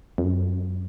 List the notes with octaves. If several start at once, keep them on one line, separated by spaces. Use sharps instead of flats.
F2
F#2